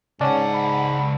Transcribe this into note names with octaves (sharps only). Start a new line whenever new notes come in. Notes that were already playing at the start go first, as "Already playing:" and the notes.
C#2 G#2 C#4 D5 F#5 A5
B5